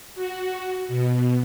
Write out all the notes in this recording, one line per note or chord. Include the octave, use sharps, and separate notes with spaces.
F#4
B2